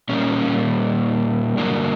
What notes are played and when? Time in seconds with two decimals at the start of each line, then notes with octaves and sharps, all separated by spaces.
0.09 A#2 G3 A#3 C#4
1.57 G2 D3 F#3 A#3 D4